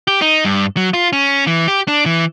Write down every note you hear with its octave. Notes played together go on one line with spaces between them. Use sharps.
G4
D#4
G2
F#3
F4
C#4
E3
G4
D4
E3